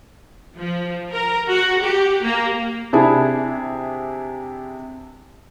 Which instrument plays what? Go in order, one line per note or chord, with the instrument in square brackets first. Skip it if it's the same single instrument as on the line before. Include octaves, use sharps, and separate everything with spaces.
[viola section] F3
A#4
F#4
G4
A#3
[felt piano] C3 D4 E4 G#4